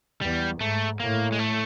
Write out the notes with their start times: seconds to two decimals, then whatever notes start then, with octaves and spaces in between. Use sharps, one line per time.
0.21 E2 G3
0.60 G#2 A3
1.00 A2 A#3
1.32 G#3
1.39 A3